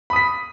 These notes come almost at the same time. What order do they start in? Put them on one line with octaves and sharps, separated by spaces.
B5 D#6 B6